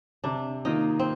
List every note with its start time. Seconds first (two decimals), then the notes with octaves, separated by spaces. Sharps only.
0.24 C3 D4
0.65 D#3 A#3 D#4 F4
0.99 C4